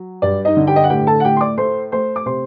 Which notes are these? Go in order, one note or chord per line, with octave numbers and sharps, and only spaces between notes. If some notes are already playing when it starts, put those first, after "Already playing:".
Already playing: F#3
G2 D5
D#4 D#5
D3
G4 G5
D#5
F#5
A2 G4 G5
A4 A5
F#5
A2 G4 G5
C6
D5 D6
A3 C5 C6
A3 C5 C6
D6
C3 C5 C6